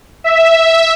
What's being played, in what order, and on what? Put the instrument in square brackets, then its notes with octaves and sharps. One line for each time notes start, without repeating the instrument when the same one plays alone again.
[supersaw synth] E5